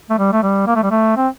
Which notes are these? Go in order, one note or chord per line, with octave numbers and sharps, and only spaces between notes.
A3
G3
A3
G3
A#3
A3
G3
A3
C4